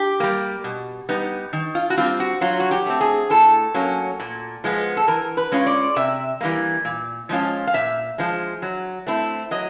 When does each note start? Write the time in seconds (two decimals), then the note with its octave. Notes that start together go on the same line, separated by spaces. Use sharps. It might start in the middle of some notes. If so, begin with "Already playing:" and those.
Already playing: G4
0.20 G3 A#3
0.64 B2
1.09 G3 B3 D#4
1.53 D#3
1.75 F4
1.90 F#4
1.97 G3 C4 F4
2.20 F#4
2.41 F#3 F4
2.60 F#4
2.71 G4
2.86 A3 C4
3.01 G#4
3.30 A2 A4
3.74 F#3 A#3 C#4
4.20 A#2
4.64 F3 G#3 B3
4.97 A4
5.07 E3 A#4
5.37 B4
5.52 G#3 C#4 F4
5.66 D5
5.96 C3 E5
6.41 E3 G3 A#3
6.85 A#2
7.29 F3 G#3 C#4 F4
7.67 F5
7.74 A#2 E5
8.18 F3 G#3
8.62 F#3
9.07 A3 C4 E4
9.51 F#3 D#5